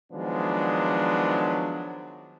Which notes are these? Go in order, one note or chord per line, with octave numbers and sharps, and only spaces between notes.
D#3 F3 F#3 G#3 B3 D4